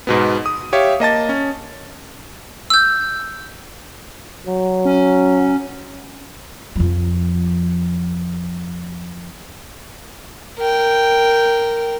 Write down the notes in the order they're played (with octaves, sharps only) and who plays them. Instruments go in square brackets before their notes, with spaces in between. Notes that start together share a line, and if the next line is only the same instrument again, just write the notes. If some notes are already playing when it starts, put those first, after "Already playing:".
[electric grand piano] G#2 B2 B3
D#6
G4 C#5 E5 F5
A#3 D#5 A5 A6
C#4
[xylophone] E6 G6
[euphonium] F#3
[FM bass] C#4
[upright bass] F2 F3
[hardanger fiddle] A#4 G5